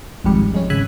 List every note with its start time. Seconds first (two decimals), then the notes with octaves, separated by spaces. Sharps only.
0.24 G#1 F2 G#2 G3 C#7
0.52 F2 G#3 C#4
0.70 G#1 C#3 E5 G#5 B5 F#6